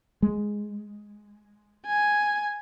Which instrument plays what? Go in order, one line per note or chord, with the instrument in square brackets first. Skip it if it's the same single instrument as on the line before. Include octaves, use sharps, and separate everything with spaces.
[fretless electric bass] G#3
[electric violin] G#5